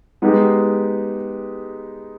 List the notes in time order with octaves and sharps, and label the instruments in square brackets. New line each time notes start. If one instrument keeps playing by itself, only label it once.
[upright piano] G#3 B3 D#4 G4